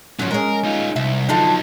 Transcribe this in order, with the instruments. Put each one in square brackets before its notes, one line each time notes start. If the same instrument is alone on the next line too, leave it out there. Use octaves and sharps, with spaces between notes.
[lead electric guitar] G#2 C#4 [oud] F3 F#3
[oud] G#3 C#4 [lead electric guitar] A#4
[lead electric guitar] D#4 F4
[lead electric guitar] C2 [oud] E5
[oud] D3 F3 A4 [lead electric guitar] F#3 D#4